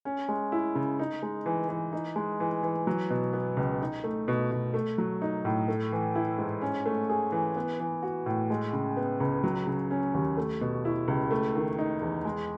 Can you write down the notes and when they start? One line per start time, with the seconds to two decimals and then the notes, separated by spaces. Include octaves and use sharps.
0.05 C#4
0.28 G#3
0.52 E4
0.75 C#3
0.99 D#4
1.23 G#3
1.46 E3
1.69 E3
1.93 D#4
2.16 G#3
2.40 E3
2.63 E3
2.87 F#3
3.10 B2
3.33 B3
3.57 C#2
3.81 D#4
4.04 A3
4.28 B2
4.51 B2
4.74 A3
4.98 F#3
5.22 D#4
5.45 A2
5.68 A3
5.92 E3
6.15 E4
6.38 G#2
6.62 C#4
6.86 A3
7.10 G#4
7.32 E3
7.56 B3
7.80 E3
8.03 F#4
8.26 A2
8.50 G#3
8.73 C#3
8.97 B3
9.20 C#2
9.44 F#3
9.67 C#3
9.91 C#4
10.14 D#2
10.37 A3
10.61 B2
10.85 E4
11.08 C#2
11.31 A3
11.55 D#3
11.78 D#4
12.02 E2
12.25 G#3